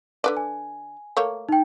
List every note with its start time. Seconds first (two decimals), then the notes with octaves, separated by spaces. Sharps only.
0.24 D3 B4 D5
0.37 G#5
1.17 A3 A#3 C#5
1.49 D#4 G5